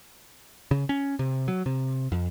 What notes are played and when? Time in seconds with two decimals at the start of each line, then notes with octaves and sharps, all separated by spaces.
0.71 C#3
0.89 C#4
1.19 C3
1.48 F#3
1.66 C3
2.12 F2